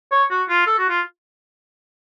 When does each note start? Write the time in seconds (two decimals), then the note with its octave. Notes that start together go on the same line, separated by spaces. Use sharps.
0.11 C#5
0.30 F#4
0.49 F4
0.67 A4
0.78 F#4
0.89 F4